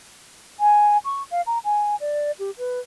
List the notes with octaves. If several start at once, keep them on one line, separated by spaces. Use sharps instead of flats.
G#5
C#6
F5
A#5
G#5
D5
G4
B4